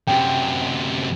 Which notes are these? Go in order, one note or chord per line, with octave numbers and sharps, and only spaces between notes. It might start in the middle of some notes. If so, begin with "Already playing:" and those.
F#2 C3 G5